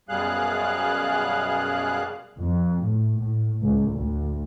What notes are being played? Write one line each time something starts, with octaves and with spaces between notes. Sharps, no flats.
F#2 B2 G3 G#4 F5 F#6
F2
A2
A2
C#2
D2